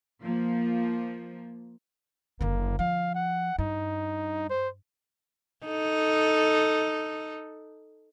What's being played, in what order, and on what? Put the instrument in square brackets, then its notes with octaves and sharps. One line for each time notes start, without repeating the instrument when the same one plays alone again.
[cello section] F3 A#3
[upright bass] F#1 D3 [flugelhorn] A#3
[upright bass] F3 [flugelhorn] F5
[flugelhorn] F#5
[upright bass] G2 [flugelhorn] D#4
[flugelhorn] C5
[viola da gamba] D#4 A4